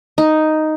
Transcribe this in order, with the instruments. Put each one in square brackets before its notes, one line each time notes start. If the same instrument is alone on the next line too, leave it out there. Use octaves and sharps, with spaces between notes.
[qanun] D#4